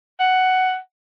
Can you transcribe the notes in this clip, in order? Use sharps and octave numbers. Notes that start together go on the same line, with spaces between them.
F#5